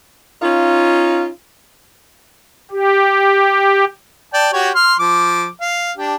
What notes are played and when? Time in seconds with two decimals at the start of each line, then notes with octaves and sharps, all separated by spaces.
0.42 C#4 D#4 F4
2.71 G4
4.34 D5 G5 A5
4.53 F#4 G4 C#5
4.75 C6 F6
4.99 F3 D6
5.61 F5
5.97 D4 G4